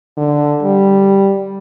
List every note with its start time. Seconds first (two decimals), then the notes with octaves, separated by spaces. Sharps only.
0.17 D3
0.63 G3